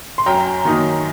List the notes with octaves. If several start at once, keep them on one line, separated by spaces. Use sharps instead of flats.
C6
F#2 G5 A#5
D#3 F#3 A#3 D#4